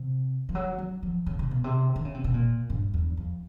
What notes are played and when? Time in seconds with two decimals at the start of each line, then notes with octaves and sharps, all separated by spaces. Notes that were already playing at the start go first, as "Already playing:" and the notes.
Already playing: C3
0.49 F3
0.55 F#3
0.78 F#3
1.03 F3
1.26 C#3
1.39 C3
1.51 B2
1.64 C3
1.96 D3
2.05 C#3
2.14 C3
2.24 B2
2.34 A#2
2.70 G2
2.94 E2
3.17 F2